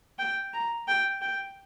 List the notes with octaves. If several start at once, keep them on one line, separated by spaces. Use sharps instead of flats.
G5
A#5
G5
G5